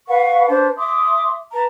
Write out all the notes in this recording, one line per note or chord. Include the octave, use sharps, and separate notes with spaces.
B4 F5 F#5 C#6
D4 B4 C5 A5
E5 C6 D6 D#6
B4 A5 A#5